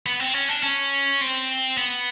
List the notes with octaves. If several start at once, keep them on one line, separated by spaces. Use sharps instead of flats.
B3
C4
C#4
D4
C#4
C4
B3